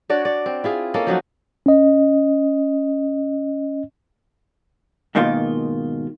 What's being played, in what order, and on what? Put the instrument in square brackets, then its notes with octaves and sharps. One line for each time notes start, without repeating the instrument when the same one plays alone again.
[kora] D4 F#4 C#5 D5
D5
C4
E4 F4 G#4
A#3 C#4 A4 D#5
F3 F#3 D#4 F#4
[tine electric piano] C#4 D#5
[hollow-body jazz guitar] G#2 B2 D#3 A#3 F4